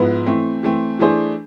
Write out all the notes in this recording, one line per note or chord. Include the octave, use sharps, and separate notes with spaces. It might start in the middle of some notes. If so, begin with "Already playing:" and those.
Already playing: G#2 F3 B3 E4 B4
E3 A3 C4
E3 A3 C4
E3 A3 D4 G#4 C5